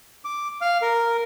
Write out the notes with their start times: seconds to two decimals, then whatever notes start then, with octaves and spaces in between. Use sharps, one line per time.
0.25 D6
0.61 F5
0.82 A#4